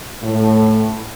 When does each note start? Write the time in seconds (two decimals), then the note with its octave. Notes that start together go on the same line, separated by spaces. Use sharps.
0.23 A2